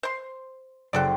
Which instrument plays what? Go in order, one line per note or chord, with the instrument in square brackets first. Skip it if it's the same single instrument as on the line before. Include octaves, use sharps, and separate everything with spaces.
[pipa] C5 C6
[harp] F#1 C5 G5 [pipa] F#4 A4 D5